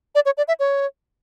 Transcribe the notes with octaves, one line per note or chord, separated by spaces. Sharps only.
D5
C#5
D5
E5
C#5